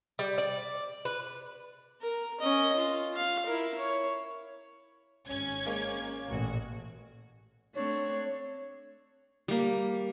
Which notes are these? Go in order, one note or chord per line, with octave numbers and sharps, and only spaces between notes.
G3
D5
B4
A#4
C#4 D#5
F4
F5
E4 A#4
C#5
G#1 C#4 G#6
G#3 A#3 C#5
A1 A#2 F#4
A3 C4 D4 C#5
G3 A#3